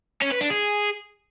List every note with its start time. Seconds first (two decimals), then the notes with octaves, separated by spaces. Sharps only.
0.22 C#4
0.31 B4
0.41 D4
0.50 G#4